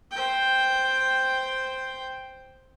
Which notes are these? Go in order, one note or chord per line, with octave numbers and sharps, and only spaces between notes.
C5 G5